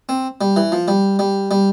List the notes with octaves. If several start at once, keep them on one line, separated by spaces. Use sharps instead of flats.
C4
G3
E3
F3
G3
G3
G3